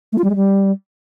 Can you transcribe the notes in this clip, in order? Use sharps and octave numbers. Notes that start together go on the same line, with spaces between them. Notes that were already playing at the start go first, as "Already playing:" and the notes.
A3
F4
G3
G#3
G3